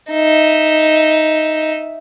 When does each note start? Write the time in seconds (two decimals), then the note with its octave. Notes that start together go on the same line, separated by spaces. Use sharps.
0.12 D#4 E5